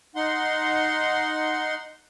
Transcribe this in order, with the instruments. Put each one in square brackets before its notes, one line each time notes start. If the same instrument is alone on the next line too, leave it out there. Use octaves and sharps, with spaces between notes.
[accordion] D#4 F#5 C6